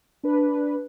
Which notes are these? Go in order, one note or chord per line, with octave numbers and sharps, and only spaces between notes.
D4 B4